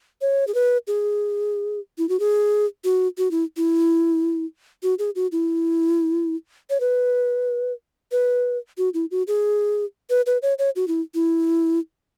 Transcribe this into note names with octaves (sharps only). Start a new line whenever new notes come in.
C#5
G#4
B4
G#4
E4
F#4
G#4
F#4
F#4
E4
E4
F#4
G#4
F#4
E4
C#5
B4
B4
F#4
E4
F#4
G#4
B4
B4
C#5
C#5
F#4
E4
E4